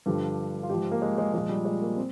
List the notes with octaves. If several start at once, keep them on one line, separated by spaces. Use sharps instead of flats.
G2 D3 F3 G4
F4
G#2 F3 G4
A#3
G#3
G#3
A#2 F3 G#3
G3
G#3
A#3
C4